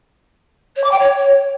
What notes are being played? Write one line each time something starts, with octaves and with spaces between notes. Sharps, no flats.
C#5
D6
G5
C#5